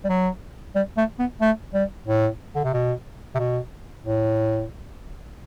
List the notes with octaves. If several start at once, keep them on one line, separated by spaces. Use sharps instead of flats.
G3
F#3
G3
A3
B3
A3
G3
A2
D3
C3
B2
C3
B2
A2